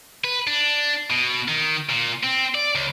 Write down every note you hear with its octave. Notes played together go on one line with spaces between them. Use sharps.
B4
D4
B2
D#3
A#2
C4
D5
C#2